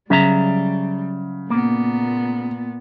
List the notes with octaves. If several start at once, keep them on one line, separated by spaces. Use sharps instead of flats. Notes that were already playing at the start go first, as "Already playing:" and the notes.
C#3 F#3 G3 E5 A#5
A#2 A#3 B3